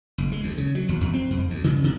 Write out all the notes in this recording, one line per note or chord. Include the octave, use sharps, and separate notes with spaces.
F#1
G#3
D2
C#3
F#3
D#2
E2
C4
F2
D2
C#3
C3